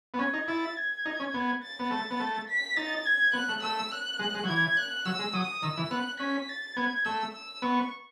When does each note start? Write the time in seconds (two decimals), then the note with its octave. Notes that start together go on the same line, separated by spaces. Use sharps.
0.14 B3
0.19 C#4 G#6
0.34 D#4
0.48 E4 A6
0.77 G#6
1.06 D#4
1.20 C#4
1.34 B3
1.62 A6
1.79 B3
1.91 A3 A6
2.11 B3
2.20 A3
2.49 B6
2.76 D#4 A6
3.05 G#6
3.33 B3 F#6
3.49 A3
3.62 A3 E6
3.91 F#6
4.19 G#3
4.34 G#3
4.43 F#3
4.48 E3 G#6
4.77 F#6
5.06 F#3 E6
5.19 G#3
5.33 F#3 D#6
5.62 D#3 E6
5.77 E3
5.90 B3 F#6
6.20 C#4 B6
6.49 A6
6.77 B3 G#6
7.05 A3 E6
7.34 E6
7.62 B3 C#6